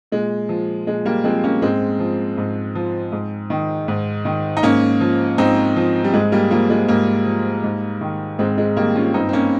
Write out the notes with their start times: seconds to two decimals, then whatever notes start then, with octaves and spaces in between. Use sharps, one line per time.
0.12 A#2 G#3
0.49 F3
0.87 A#2 G#3
1.05 G3 A#3
1.24 F3 G#3 C4
1.44 A#3 C#4
1.62 G#2 G#3 C4
1.99 F3
2.38 G#2
2.75 F3
3.12 G#2
3.50 D#3
3.88 G#2
4.25 D#3
4.57 D#4
4.63 G#2 A#3 C#4
5.01 F3
5.38 G#2 C4 D#4
5.76 F3
6.04 G3
6.13 G#2 G#3
6.32 G3 A#3
6.51 F3 G3 A#3
6.70 G#3
6.88 G#2 G3 A#3
7.26 F3
7.64 G#2
8.01 D#3
8.39 G#2 G#3 C4
8.58 G#3
8.77 D#3 G3 A#3
8.96 C#4 F4
9.14 G2 C4 D#4
9.29 C4
9.33 A#3 C#4